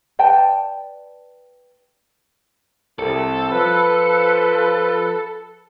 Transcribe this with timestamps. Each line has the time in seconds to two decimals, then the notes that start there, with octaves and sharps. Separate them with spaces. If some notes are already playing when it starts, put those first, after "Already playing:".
0.19 B4 D5 G5 A5
2.99 C2 A4
3.51 F3 B4